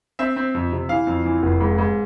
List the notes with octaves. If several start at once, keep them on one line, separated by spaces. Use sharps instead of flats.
C4 E5
C4
F2
C3
E3 F5
F2
E3
F1
G#2
G#2